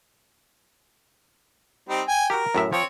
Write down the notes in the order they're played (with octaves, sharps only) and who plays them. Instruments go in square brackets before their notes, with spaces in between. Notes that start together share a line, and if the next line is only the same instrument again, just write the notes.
[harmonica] G3 C4 D#4
G5 G#5
[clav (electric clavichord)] F#4 G4 [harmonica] A#4
[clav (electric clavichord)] F#2 A2 E5
[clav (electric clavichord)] F3 [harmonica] C4 C#5